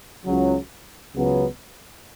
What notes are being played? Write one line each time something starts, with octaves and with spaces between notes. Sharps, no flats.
C#2 C#3 F#3
C#2 C#3 F#3 B3